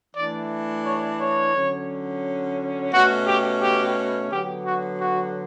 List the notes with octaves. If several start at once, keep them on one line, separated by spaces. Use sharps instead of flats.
E3 A3 D4 D5
C#5
C#5
D3 F#3 C#4
B2 A3 C#4 F#4
G4
G4
D3 F#3 B3 G4
F#4
F#4